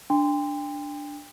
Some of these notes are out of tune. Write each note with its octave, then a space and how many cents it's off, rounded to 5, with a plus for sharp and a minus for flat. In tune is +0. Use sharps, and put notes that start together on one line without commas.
D4 +0 G5 +35 C6 -20